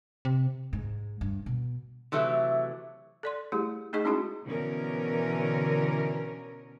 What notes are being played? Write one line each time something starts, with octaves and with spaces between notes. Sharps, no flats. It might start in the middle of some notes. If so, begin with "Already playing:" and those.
C3
G#2
G2
B2
C3 E3 F#3 A3
A4 D5 C6
G3 A3 E4 G4 G#4
A3 D#4 G#4 D#5 C#6
G#3 C#4 D#4 E4 F#4 G#4
B2 D3 E3 C#4 A#4